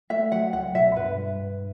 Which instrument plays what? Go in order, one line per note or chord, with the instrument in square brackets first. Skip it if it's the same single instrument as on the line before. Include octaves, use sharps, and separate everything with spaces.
[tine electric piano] A3 [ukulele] E5
[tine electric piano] F#3 [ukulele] F#5
[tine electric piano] C#2 [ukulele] F#5
[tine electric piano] B2 [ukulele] E5
[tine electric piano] G2 [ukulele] B4
[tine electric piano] G3
G2